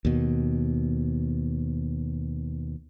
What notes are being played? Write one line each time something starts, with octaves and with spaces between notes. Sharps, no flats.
D#2 B2